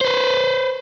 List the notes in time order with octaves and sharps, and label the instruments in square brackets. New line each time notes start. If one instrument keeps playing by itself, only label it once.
[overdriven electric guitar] B4 C5